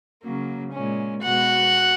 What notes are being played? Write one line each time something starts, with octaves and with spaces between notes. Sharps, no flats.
C#3 F#3 A#3
A#2 G#3 C#4
B2 G#3 B3 F#4 F#5